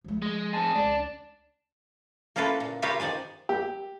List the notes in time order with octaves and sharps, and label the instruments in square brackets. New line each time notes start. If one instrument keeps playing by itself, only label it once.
[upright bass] F3 A3
[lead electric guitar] G#3
[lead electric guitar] C4 G#4 [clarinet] A5
[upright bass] C#2 C#3 [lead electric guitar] D4
[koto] A#3 C#4 E4 F4 A4 B4
A#2
F4 G4 A#4 B4 C#5 F5
D#3 F3 D5 G#5
[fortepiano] G4